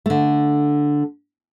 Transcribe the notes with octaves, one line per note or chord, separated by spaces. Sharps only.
D3 A3